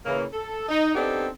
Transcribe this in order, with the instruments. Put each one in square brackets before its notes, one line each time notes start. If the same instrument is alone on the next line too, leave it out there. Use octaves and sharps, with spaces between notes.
[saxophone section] C#3 E3 A#3
A4
D#4
B3 C4 D4 D#4 G4 A4